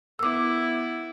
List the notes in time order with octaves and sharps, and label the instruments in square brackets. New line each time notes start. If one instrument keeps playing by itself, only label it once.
[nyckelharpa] B3 E4 [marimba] D6 E6